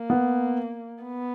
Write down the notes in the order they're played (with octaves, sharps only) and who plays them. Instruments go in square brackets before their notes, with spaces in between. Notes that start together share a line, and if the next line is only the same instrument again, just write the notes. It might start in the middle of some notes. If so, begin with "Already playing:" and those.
Already playing: [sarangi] A#3
[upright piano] B3
[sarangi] B3